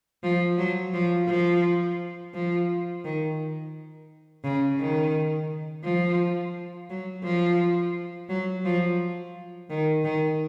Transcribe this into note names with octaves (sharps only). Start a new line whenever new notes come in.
F3
F#3
F3
F3
F3
D#3
C#3
D#3
F3
F#3
F3
F#3
F3
D#3
D#3